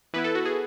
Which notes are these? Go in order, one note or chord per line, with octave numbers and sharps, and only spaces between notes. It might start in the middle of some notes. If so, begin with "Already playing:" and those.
E3 B3 E4 B4
A4
F#4
G#4